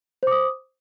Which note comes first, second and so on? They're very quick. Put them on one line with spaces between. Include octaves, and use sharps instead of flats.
C5 D6 D#6